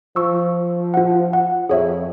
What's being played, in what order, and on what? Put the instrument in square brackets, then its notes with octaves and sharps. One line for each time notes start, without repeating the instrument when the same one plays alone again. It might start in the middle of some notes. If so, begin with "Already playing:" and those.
[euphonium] F3 [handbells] C#6 E6
[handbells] F4 F#5
F#5
[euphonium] F2 [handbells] G#4 C#5 E5